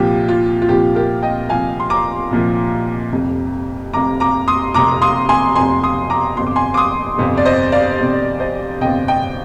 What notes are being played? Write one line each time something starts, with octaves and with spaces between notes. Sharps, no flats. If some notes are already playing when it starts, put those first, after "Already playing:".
Already playing: C2 A#2 F3 G4
F4
F4
C2 A#2 F3 G4
G4 A#4
D#5 G5
C2 A#2 F3 F5 G#5
C6
A#5 D6
C2 A#2 F3
F1 F2 C3
F1 F2 C3 A#5 D6
A#5 D6
C6 D#6
F1 F2 C3 A#5 D6
C6 D#6
G#5 C6
F1 F2 C3 G#5 C6
C6 D#6
A#5 D6
G1 F2 C3 C6
D6
G#5 C6
D6
C6 D#6
G1 F2 C3
D5
C5 D#5
D5 F5
G1 F2 C3
C5 D#5
G1 F2 C3 D#5 G5
D#5 G5